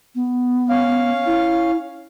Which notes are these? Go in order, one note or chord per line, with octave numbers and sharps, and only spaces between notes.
B3
C#4 F5
E4